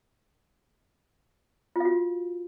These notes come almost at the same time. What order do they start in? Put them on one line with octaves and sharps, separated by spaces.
F4 F5 F#4